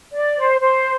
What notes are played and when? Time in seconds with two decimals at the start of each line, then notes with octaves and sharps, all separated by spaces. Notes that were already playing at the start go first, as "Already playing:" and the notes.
0.12 D5
0.36 C5
0.60 C5